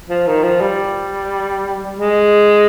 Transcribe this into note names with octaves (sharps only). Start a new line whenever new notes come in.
F3
D#3
F3
G3
G#3